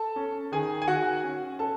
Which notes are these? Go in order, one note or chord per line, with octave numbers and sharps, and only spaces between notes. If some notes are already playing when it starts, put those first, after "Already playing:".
Already playing: A4 A5
C#4
D#3 G#4 G#5
G#5
D#3 F#4 F#5
C#4
C#4 A4 A5